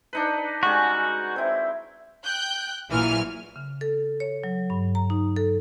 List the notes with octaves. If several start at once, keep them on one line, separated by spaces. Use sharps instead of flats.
D4 D#4 B4
G3 G#3 C#4 F#4
C4 E4
G5 F#6 G6
A#1 A#2 E3 F#3 G#5 F6
C#3
A4
C#5
F#3
G2
A#5
D#4
A4